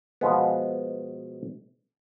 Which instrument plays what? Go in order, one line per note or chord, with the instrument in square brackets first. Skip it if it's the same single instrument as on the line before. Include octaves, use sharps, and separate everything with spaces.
[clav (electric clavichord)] B2 F3 G#3 B3